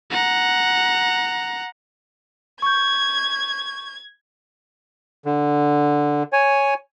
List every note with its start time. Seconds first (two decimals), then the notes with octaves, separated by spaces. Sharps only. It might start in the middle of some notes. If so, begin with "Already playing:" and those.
0.11 F#5 A#5
2.62 C#6 G6 G#6
5.25 D3
6.33 C#5 G#5